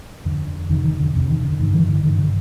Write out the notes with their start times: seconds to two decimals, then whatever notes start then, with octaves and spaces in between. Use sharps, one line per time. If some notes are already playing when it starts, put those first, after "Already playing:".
0.25 F2 D3
0.70 F2 C3 D#3
0.84 D#3
1.00 D3
1.15 F2 C3
1.30 D#3
1.44 D3
1.59 G2 D3 D#3
1.74 E3
1.89 D3
2.04 G2 D3 D#3
2.19 D3